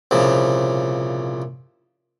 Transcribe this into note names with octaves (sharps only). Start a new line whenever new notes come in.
C2 A#2 C#3 F3